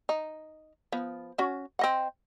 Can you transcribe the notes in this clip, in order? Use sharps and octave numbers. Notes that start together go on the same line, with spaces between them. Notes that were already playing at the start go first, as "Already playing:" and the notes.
D#4
F3 B3
C#4 F#4
C4 D#5 F#5